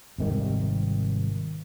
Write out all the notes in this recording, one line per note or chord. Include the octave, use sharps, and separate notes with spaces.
G#1 C3 D#3 G3